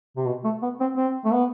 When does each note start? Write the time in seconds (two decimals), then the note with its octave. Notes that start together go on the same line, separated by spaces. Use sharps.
0.17 C3
0.26 B2
0.44 A3
0.62 B3
0.80 C4
0.97 C4
1.25 A3
1.33 B3